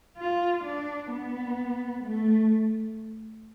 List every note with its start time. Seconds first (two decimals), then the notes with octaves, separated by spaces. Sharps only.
0.17 F4
0.64 D4
1.10 B3
2.04 A3